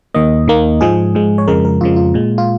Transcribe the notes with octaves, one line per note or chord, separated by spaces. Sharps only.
D#2 D#3 A#3 D#5
D#2 D#3 A#3
G#2 F3 G#3 G#4
G#2 F3 G#3
C#5
F2 C#3 F3 G#3 A#4
A#4
F2 C#3 F3 G#3 F4
F4
A#2 G#3
F4